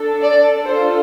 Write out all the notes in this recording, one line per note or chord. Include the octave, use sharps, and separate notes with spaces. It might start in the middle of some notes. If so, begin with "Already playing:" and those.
Already playing: D4 A4
D5
D4 F4 A4 C5